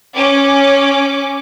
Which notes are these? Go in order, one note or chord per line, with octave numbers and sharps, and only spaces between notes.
C#4 D6